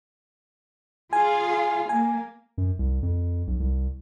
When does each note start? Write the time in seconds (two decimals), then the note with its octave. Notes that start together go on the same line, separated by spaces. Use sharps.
1.13 F4 G#4 F5 G#5
1.89 A#3 G#5
2.58 F#2
2.79 C2
3.03 F2
3.47 B1
3.60 C2